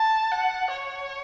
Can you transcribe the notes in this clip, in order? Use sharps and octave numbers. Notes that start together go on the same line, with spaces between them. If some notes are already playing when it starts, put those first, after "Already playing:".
Already playing: A5
F#5
C#5